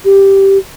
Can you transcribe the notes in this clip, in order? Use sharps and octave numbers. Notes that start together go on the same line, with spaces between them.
G4